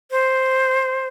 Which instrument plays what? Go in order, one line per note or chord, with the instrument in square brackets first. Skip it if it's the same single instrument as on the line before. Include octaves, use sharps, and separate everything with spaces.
[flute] C5